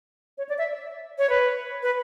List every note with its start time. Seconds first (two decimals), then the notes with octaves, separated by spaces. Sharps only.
0.38 C#5
0.49 D5
0.58 E5
1.18 C#5
1.30 B4
1.83 B4